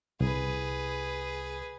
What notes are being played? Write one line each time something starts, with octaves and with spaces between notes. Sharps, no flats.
C2 G#4 B4